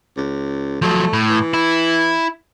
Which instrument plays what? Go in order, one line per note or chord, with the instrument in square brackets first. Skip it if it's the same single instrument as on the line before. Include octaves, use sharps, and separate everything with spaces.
[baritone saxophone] C#2
[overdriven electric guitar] F3 F#3 [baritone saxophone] A3
[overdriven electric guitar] A2
[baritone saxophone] E3
[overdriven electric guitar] E4